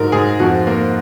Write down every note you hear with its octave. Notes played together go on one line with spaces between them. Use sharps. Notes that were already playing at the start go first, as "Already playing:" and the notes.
Already playing: G#2 F#3 A#4
G#2 G#4
F2 F#4
A#3